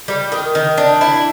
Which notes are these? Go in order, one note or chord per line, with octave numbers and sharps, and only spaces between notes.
G3
D#3
D#3
D4
E4